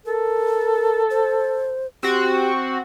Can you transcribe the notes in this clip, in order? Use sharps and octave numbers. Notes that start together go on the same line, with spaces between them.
A4 A#4
C5
C4 F#4 G4